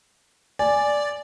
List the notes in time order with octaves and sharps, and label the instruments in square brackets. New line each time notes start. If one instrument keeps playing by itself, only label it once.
[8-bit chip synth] D5 [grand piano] G#5